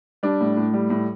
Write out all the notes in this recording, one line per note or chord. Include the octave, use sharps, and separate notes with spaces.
G3 D4
A2
A2
G3
A2